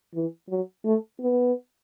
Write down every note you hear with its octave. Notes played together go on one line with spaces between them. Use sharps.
E3
F#3
A3
B3